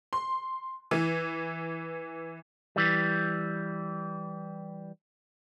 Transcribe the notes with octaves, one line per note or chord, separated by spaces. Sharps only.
C6
E3
E3 G3